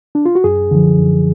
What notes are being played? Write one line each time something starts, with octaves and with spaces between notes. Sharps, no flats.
D4
F4
F#4
F#2 G#4
D3 F3
F#2